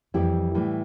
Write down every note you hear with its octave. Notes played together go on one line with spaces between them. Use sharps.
F2 E3 G3 E4 G4
A2 E3 G3